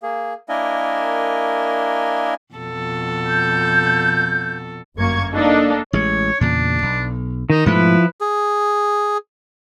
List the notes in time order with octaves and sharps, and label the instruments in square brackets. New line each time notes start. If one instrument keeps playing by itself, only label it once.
[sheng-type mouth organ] A#3 G#4
A#3 D4 E4 A#4 D#5 G#5
[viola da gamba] F2 B2 A4
[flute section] G6
[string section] G1 F#2 A#3 C#6 G#6
A#3 D4 D#4 A4
[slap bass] A1 G#3 [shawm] C#5
[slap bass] E2 A#2 C#3 [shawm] D4
[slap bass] B1
[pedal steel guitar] D#3 [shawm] D#4
[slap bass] G#2 B2 A3 [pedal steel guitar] F3 E4 [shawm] B4
[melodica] G#4